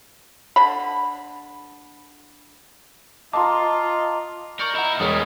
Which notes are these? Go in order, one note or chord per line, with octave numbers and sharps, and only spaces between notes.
D3 B5
F4 D#5 A5 A#5 C6 D6
A#4 D5 C#6 G6 C#7
D#2 E4 D#5 F#5 A#5
E1 G3 G#3 G#4 D#6 F6